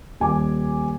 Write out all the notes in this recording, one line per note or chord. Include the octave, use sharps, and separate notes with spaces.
D#1 G#5 D6